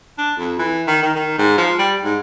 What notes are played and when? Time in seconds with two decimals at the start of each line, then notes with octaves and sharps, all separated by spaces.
0.18 D4
0.38 F2
0.59 E3
0.87 D#3
1.02 D#3
1.15 D#3
1.39 G#2
1.58 F3
1.79 G3
2.04 G#2